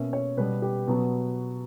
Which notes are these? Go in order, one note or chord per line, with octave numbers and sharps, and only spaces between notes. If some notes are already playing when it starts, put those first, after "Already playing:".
Already playing: B2 A#3 C#4 E5
C#5
B2 G3 B3 B4
G4
B2 F#3 B3 F#4